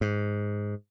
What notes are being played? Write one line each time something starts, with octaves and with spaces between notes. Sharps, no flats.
G#2